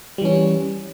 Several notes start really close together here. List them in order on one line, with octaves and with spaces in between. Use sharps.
G3 E3 C#4